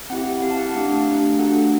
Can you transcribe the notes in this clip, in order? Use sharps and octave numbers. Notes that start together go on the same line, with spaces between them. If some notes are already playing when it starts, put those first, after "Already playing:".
C4 E4 G4 F#5
C4 E4 G4 F5
A5
F#5
F5
A3 D4 G4
A3 D4 G4
A3 D4 F#4 A4 F#5